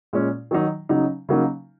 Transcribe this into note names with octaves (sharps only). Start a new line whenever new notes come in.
A#2 G#3 C#4
D#3 F#3 D#4
C#3 F#3 D#4
C#3 F#3 A#3 D#4